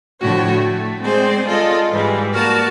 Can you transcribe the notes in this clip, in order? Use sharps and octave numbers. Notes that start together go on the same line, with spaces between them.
A2 D3 F3 F#4 C#5 G5
A3
G#3 C4 G#4 C5 D5
F4 G#4 A4 D5 D#5
G#2 E3 G3 G#3
A#3 F#4 A#4 D5 A5